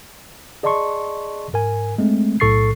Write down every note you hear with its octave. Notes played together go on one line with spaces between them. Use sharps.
G#4 D5 D#5 A5 C6 C#6
G#2 A#4 G#5
G#3 A3 C4
B1 A2 A4 C#6 A6 C7